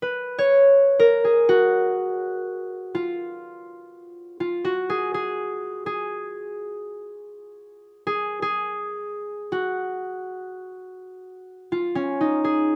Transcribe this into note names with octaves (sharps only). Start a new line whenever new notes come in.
B4
C#5
A#4
G#4
F#4
F4
F4
F#4
G#4
G#4
G#4
G#4
G#4
F#4
F4
C#4
D#4
G#4